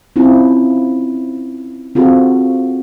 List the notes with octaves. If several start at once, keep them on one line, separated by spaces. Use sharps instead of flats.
C4 C#4 E4 F4
C4 F4 F#4 G#4 A4